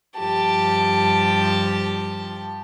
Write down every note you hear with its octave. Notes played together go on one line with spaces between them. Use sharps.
G2 F3 G4 A5